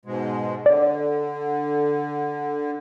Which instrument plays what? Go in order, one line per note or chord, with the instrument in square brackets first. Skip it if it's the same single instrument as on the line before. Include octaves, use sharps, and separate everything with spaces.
[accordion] G#2 B2 G#3
[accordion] D3 [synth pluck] D5